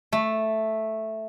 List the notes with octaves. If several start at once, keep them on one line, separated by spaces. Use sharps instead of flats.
A3